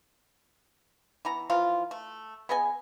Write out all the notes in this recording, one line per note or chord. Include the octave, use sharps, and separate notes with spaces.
E3 B3 A#5
E3 F3 F4 A#4
A3
B3 G#4 D#5 G#5